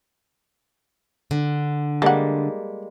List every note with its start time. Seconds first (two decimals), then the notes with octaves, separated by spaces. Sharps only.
1.31 D3
2.02 G3 G#3 A#3 A4 F#5